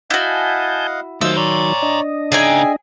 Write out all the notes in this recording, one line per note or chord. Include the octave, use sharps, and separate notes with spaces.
E4 F#4 D#5 F5 F#5 G#5 A5 G6
D#3 F#3 A3 F4 C5 D#5 E6
C#5 D5 A#5 C6
D4 D#5
C#3 D#4 G#4 E5 G5 G#5